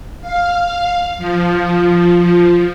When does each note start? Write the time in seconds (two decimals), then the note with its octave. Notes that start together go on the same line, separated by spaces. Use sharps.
0.21 F5
1.18 F3